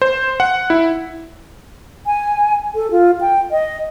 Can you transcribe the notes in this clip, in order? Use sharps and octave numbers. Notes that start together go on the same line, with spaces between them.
C5
F#5
E4
G#5
A4
F4
G5
D#5